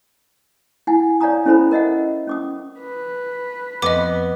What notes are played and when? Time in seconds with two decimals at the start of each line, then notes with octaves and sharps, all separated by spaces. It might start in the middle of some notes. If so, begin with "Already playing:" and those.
0.87 E4 F#5 G#5
1.21 C#5 D5 F5 G#5 A#5 D#6
1.46 C#4 E4 A4 C5 A#5 B5
1.71 A#4 D#5 E5 F#5
2.27 C#4 D6 D#6
2.80 B4
3.82 F2 B3 D#5 D6